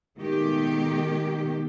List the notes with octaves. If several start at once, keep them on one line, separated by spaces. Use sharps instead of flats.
B2 D#3 G#3 A3 G4